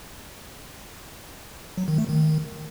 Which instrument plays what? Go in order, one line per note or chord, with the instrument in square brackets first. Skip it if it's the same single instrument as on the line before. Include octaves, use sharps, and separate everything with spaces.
[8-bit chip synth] F#3
D#3
A3
D#3